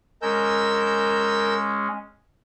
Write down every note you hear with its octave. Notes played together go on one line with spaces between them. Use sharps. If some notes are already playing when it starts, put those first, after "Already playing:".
G#3 C#4 A#4 E6 G6